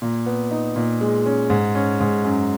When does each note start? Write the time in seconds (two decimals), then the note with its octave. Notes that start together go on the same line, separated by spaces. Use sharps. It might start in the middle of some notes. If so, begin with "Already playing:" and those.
0.02 A#2
0.26 B3
0.51 D#4
0.76 A#2
1.01 G#3
1.26 C#4
1.50 G#2
1.75 C#4
2.00 G#2
2.25 F#2